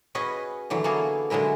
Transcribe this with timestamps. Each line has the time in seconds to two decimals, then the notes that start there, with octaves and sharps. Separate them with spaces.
0.15 C#4 F#4 G#4 B4 D#5
0.70 D3 E3 F#3
0.84 A#3 B3 F#4 G#4 A4
1.30 D3 F#3 G#3 E4 A#4